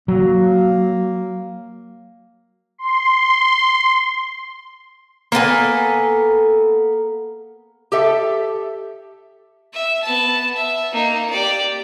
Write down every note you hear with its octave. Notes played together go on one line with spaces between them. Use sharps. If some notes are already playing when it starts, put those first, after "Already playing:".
F#3 A#3
C6
A#3 B3 A4 G#5
G4 A4 E5
E5
B3 A5
E5
A#3 D#4
G4 D5